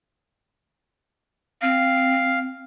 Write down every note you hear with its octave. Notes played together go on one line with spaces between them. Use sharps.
C4 F5